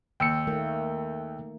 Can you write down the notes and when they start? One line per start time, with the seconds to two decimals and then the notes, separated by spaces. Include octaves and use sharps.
0.20 D#2 G5 E6 C#7
0.47 D#3 A3 A#3